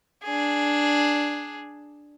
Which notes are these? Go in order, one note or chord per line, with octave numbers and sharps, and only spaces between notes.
D4 G#4